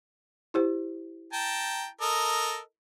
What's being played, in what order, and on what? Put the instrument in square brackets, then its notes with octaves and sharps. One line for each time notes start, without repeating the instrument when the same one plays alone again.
[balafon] E4 G4 C5
[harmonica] G5 A5 A#5
A4 A#4 D#5